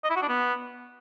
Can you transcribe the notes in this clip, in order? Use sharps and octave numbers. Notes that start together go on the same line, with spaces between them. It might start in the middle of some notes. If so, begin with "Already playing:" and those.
D#5
E4
F#4
D4
B3